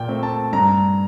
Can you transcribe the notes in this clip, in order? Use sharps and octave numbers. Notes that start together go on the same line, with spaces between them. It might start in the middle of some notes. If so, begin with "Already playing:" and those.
Already playing: A#2 G5
A3 C4
A5
G2 A#5